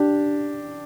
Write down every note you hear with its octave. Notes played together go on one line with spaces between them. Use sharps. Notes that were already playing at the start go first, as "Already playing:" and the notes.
Already playing: D4 G4